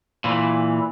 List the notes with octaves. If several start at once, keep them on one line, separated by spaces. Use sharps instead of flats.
A#2 E3